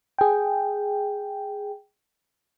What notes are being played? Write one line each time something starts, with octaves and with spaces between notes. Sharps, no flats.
G#4 G5